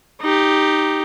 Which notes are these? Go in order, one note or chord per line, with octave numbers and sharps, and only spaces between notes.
D#4 G4